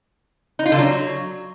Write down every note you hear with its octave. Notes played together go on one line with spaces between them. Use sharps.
D#4
F4
D3
F#3